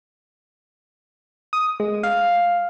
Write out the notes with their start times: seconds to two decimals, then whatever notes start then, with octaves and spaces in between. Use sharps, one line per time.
1.53 D#6
1.80 G#3
2.03 F5